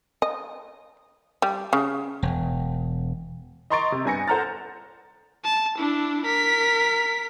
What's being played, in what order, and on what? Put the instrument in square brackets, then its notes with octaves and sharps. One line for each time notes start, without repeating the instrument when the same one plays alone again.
[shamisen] D#5
G3
C#3
[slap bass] E1
[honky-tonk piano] D#5 A#5 C6 C#6 A6 D7
C3
G2 B3 G#5 A#6 C#7
A4 C5 F#5 A#5 F6 A6
[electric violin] A5
D4 E4
A#4 B6